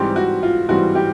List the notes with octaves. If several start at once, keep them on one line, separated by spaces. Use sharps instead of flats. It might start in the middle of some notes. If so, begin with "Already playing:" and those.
Already playing: G#2 E3 G3 C4 G4
F#4
F4
G#2 E3 G3 C4 F#4
G4